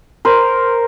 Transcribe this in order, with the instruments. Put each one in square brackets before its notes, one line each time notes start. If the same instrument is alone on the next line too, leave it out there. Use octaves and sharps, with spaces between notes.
[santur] A#4 C5